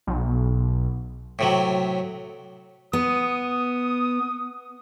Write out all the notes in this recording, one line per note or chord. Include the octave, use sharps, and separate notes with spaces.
B1
A2 C3 F#3
B3 D#6